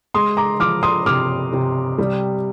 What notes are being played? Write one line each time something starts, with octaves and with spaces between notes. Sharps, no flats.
G#3 C6 D#6
A#5 D6
F3 D6 F6
C6 D#6
C3 D6 F6
C3
G3